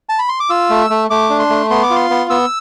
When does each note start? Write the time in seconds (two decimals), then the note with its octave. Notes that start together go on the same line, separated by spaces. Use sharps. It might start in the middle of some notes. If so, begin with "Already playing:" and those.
0.09 A5
0.19 B5
0.29 C6
0.40 D6
0.50 F4 E6
0.70 A3
0.90 A3
1.10 A3 D6
1.30 D4
1.40 C6
1.50 A3
1.70 B3 C6
1.83 D6
1.90 F4
1.96 C6
2.10 B3
2.30 B3 E6